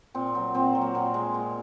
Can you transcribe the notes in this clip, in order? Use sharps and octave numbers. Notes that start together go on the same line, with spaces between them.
A#2 C4
F#3 C4
A#2 C4
F#3
A#3
A#2 C4
G#3
A#2